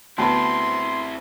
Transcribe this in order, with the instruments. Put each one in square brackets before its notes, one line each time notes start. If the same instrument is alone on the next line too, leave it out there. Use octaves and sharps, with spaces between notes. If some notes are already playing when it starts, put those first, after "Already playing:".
[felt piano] D2 B3 [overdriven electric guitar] C4 E4 [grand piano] A5 B5 [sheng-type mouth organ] C6